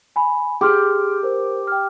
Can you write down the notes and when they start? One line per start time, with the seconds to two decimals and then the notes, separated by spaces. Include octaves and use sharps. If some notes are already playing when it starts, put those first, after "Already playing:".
0.16 G#5 B5
0.61 G4 G#4 C6 F6
1.23 A#4 C5
1.67 G5 F6